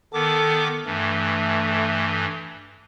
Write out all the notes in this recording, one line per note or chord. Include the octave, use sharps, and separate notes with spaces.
D#3 B3 A4 D6
G2 E3 A3